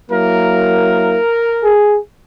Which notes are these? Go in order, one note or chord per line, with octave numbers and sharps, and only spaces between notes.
F#3 A#3 E4 A#4
G#4